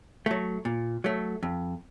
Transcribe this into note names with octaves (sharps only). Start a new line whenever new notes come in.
F#3 A3
A#2
F#3 A3
F2